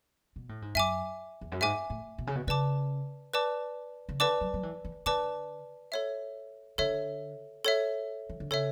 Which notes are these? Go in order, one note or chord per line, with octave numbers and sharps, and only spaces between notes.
B2
A2
G#2
F#2 E5 G#5 D6
E2
F#2
G#2 E5 G#5 D6
A2
B2
C#3
B2
C#3 B4 D5 A5 D6
B4 D5 A5 D6
C#3
D3 B4 D5 A5 D6
F#3
F#3
E3
E3
D3 B4 D5 A5 D6
A4 C#5 E5
D3 A4 C#5 E5
A4 C#5 E5
E3
D3
C#3 A4 C#5 E5